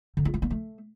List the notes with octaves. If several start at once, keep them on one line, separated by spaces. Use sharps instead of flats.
D3
F4
G#3
A#3
A3